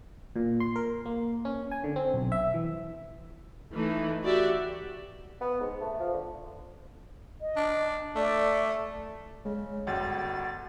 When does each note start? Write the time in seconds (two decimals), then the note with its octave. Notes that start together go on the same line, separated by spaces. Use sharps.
0.36 A#2
0.60 C6
0.76 A#4
1.05 A#3
1.45 C#4
1.71 G#5
1.84 D3
1.96 C4
2.14 B1
2.32 E5
2.54 E3
3.73 E3 A3 D#4
4.22 F#4 G4 D5 E5
5.40 B3
5.60 G#2
5.80 A3
6.00 F3
6.13 D3
7.41 D#5
7.56 D4
8.16 A3 D5
9.45 C#3 G#3
9.87 G1 C#2 F#4 A6